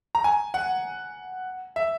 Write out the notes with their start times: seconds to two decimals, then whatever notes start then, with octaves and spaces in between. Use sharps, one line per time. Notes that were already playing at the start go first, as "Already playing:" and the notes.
0.15 A#5
0.24 G#5
0.54 F#5
1.76 E5